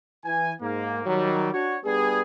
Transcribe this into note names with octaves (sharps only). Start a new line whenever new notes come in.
E3 G#5
G#2 A#3
D#3 F#3 G3
D4 F#4 C#5
G3 B3 D4 G#4